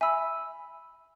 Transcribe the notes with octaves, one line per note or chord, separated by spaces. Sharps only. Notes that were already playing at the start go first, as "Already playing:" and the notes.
E5 G#5 B5 E6